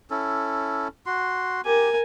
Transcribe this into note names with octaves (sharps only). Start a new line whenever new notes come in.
C#4 E4 A4
F#4 C6
G4 A#4 G#5